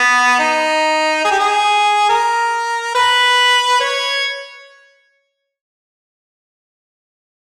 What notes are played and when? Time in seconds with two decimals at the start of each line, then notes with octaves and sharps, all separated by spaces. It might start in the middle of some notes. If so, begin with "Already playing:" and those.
Already playing: B3
0.39 D#4
1.25 G#4
1.31 G4
1.39 G#4
2.09 A#4
2.95 B4
3.80 C#5